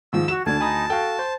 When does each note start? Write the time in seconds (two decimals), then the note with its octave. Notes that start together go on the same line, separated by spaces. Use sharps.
0.13 G#2 D#3 F3 E6
0.28 F#4 E7
0.46 D2 D3 D4 A5 G#6
0.61 D#4 G#5 B5 D#6
0.90 F#4 A4 F5 G5
1.19 C5